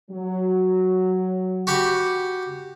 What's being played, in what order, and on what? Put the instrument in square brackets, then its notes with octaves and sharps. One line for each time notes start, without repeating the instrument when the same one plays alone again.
[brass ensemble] F#3
[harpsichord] F#4 G4 B5